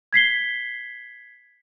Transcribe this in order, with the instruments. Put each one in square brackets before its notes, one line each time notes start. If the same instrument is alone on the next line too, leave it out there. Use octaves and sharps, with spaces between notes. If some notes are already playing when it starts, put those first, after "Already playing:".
[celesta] G#6 B6 C7 G7